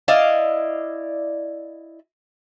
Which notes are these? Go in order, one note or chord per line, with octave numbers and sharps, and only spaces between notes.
E4 D5 D#5 F5